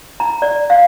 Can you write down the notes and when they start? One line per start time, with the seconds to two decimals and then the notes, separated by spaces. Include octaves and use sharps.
0.20 A#5
0.42 D5
0.70 F5